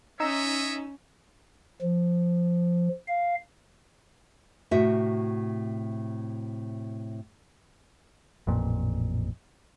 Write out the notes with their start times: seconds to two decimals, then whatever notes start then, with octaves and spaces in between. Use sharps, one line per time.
0.20 C#4 D#4 C#5 D#5 E5 E6
1.82 F3
3.07 F5
4.71 A2 C3 F#4 E5
8.47 A1 F2 A#2